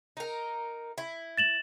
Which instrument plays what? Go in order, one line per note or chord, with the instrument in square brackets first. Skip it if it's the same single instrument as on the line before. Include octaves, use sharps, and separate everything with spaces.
[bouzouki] D#4 A#4
E4
[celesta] A6 E7 F#7